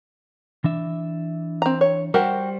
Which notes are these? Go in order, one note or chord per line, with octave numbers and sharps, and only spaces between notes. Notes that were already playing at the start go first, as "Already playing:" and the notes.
E3 D4 E5
C4 A#5
C#5
G3 F#4 G4 A#4 C5